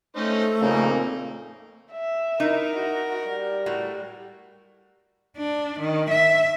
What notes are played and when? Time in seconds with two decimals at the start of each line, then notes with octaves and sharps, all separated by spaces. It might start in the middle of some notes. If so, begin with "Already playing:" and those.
0.16 A3 C#4 D#4 C5
0.62 F2 A#2 C#3 A#3 D#4
1.92 E5
2.40 D#4 E4 A#4
2.74 F#4
3.29 G3
3.66 A2 F#4
5.38 D4
5.80 D#3
6.11 E5